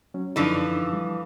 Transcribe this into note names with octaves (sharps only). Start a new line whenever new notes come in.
F#3 C#4
F#2 D3 E3 F3 D4 D#4
G3